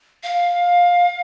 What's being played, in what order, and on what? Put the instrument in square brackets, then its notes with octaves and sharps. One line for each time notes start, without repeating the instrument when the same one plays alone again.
[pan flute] F5